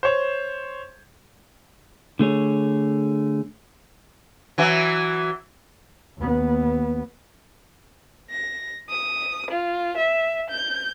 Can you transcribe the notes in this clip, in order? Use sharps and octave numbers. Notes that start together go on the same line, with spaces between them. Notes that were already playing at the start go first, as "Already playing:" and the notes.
C5 C#5
D3 A3 G#4 C#5
E3 F#3
D#2 B3
A#6
D#6
F4
E5
G6